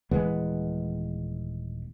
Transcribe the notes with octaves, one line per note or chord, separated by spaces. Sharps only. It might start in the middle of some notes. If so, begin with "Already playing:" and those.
D#1 E3 G#3 B3